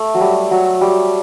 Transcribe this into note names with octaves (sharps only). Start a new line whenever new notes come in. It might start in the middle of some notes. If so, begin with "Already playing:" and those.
Already playing: A3
F#3
G3
F#3
G3